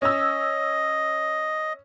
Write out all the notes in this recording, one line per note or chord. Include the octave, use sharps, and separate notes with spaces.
C#4 D#5 E6